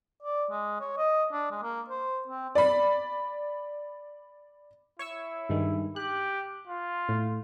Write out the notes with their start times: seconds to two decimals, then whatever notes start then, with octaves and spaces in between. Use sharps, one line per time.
0.23 D5
0.51 G#3
0.80 C#5
0.97 D#5
1.32 D4
1.51 G#3
1.62 A#3
1.90 C5
2.28 C4
2.55 D5 B5
4.99 E4 C#5 C#6 E6
5.49 G2 D#3 G#3
5.96 G4 F#6
6.67 F4
7.09 A2